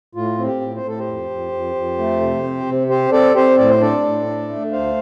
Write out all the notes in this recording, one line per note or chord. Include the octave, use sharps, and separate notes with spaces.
A2 F4
C4
G4
A2
C5
A2 A4
G4 C5
F2
F2
F2
F2
A3
C3
C4
C3
C4 G4 C5
C4 A4 D5
C4 G4 C5
A2 D5
C5
D4 A4 D5
A2
D4
A3
D2 C5 F5